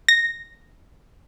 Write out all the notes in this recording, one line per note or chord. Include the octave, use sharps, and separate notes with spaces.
A#6